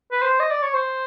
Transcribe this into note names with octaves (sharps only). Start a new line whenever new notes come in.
B4
C5
D#5
D5
C#5
C5